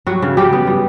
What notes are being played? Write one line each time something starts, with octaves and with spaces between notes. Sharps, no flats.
F#3 G3 F#4
C#3
C#3 G3 G4
B3
G3